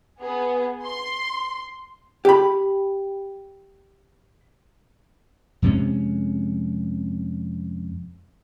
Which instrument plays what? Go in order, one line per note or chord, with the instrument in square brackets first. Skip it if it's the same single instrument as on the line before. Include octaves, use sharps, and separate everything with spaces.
[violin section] B3 G#4
C6
[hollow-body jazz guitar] G4 B5
[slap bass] F2 C3 G#3 C#4